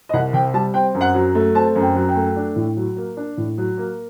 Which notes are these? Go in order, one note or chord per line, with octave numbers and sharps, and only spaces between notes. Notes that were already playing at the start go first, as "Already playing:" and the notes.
D#5
C2 F#5
C3 G5
G3 A5
C4 G5
F#2
F#5
F#3
A3
C4 A5
F#2
G5
F#3
G5
A3
D4
A2
F#3
A#3
D4
A2
F#3
A#3